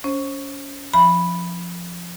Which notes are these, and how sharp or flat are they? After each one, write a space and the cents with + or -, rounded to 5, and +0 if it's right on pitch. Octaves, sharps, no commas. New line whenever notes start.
C#4 +25 C5 +35
F3 +0 E5 +0 B5 +0